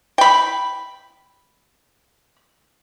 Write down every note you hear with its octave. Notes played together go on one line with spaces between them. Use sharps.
G5 B5